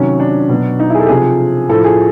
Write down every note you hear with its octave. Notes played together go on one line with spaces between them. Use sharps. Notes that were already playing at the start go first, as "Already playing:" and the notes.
Already playing: C3 D#3 F#3 C#4
D4
B2 F#3
D#4
E4
G#4
A4
G4
C3 F3 G#4
A2 F3 A4
G#4